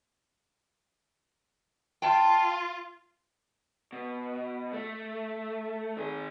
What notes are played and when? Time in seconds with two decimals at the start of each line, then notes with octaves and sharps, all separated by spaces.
2.02 F4 G5 A5
3.93 B2
4.73 A3
5.97 D#3 G#4